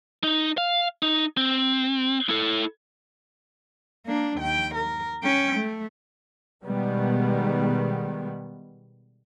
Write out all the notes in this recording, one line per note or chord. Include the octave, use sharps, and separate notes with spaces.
D#4
F5
D#4
C4
E4 A4
A#3 D4
D#2 G5
A#4
C#4 G5
A3
B2 D#3 G3 G#3 B3